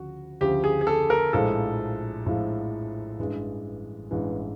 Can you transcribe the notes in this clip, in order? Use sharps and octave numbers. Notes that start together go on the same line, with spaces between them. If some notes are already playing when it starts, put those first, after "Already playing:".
Already playing: D2 C#3 F3 F#4
D2 C#3 F3 G4
G#4
G#4
A4
A#4
A#1 A2 F3 G#3 A4
A#1 A2 F3 G#3
A1 G2 E3 G#3
A1 G2 E3 G#3